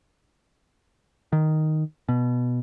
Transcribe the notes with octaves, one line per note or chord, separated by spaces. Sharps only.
D#3
B2